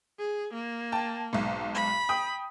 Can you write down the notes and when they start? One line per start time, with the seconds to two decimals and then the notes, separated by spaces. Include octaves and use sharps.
0.19 G#4
0.53 A#3
0.92 G5 A5
1.33 B1 G#2
1.75 B5
2.09 G5 D#6